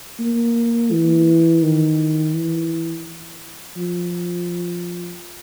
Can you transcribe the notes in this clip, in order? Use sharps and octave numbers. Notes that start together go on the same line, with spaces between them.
A#3
E3
D#3
E3
F3